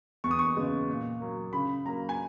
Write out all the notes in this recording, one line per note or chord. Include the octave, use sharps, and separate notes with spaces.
E2 C#6
D#6
C#6
C#3 G#3 B3
A#2
F#3 A#3
C#3 B5
F#3 A#3 A#5
G#5